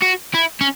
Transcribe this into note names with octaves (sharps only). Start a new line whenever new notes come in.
F#4
E4
C#4